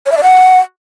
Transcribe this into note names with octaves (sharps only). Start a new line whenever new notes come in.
C#5
E5
D5
F#5